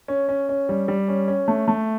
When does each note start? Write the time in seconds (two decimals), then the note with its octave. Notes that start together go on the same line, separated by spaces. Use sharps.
0.08 C#4
0.29 C#4
0.49 C#4
0.69 G3
0.88 G3
1.08 C#4
1.28 C#4
1.48 A3
1.68 A3